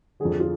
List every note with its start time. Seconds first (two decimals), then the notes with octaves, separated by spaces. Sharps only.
0.20 D3 G#4
0.25 F2
0.40 F4